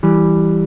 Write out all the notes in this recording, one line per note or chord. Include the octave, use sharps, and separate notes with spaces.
E3 G3